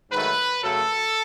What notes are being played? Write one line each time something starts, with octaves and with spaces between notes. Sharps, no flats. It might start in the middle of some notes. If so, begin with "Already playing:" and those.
G#2 D#3 F#3 A3 B4
F#2 C#3 F#3 A3 A4